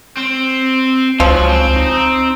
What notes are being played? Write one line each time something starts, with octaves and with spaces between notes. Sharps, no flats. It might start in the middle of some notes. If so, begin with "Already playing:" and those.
C4
C#2 F3 F#3
C4
D#4